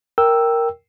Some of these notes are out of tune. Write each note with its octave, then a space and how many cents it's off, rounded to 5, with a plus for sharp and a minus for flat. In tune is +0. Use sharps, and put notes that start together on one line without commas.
A#4 +0 G5 +0 E6 +0